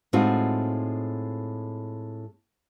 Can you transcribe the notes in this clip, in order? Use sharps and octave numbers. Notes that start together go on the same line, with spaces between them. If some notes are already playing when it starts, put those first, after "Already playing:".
A2 G#3 C4 D#4 F4 F#4